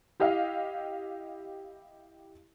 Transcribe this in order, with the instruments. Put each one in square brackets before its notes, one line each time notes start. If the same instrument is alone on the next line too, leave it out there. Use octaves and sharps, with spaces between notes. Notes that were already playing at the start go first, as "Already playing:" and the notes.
[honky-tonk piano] E4 G4 D#5 F5